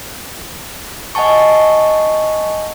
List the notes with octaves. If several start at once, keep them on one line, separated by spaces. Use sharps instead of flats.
D#5 F#5 G#5 A5 C#6